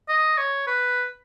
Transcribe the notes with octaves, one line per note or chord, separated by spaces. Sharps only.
D#5
C#5
B4